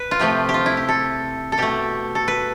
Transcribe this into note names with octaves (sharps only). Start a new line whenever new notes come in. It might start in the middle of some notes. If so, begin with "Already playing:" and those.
Already playing: B4
F4
C3 F3 A3 G4
G4
F4
E4
G4
A4
A4
B2 A3 G4
A4
B4